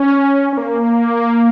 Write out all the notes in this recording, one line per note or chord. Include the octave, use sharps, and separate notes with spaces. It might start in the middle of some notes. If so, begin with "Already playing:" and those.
Already playing: C#4
C#4
A#3